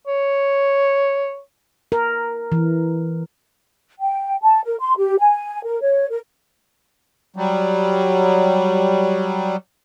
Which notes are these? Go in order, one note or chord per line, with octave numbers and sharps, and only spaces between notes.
C#5
A#4
E3
G5
A5
A#4
C6
G4
G#5
A#4
C#5
A#4
F#3 G3